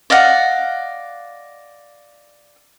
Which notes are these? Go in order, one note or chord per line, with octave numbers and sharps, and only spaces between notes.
D5 D#5 F5 F#5